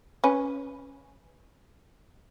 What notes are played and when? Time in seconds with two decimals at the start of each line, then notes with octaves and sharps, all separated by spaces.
0.24 C#4 B4